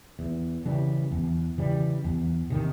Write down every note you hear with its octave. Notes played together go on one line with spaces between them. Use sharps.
E2
C#3 E3 G3
E2
C#3 E3 G3
E2
C3 D#3